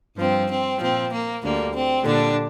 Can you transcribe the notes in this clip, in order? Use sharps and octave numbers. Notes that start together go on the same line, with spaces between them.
G2 F3 C4
C4
A#2 F3 C4
A#3
D2 D3 G3 A#3
C4
A#2 D3 G3 D4